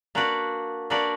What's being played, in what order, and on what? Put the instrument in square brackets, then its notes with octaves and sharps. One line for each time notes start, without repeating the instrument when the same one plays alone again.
[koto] A#3 D4 F#4 B4 D5
A#3 D4 F#4 B4 D5